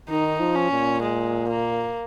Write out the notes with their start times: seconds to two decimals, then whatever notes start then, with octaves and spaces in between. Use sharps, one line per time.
0.09 D#3 D#4
0.40 F3
0.55 C#4
0.71 A#2
1.02 G#3
1.49 A#3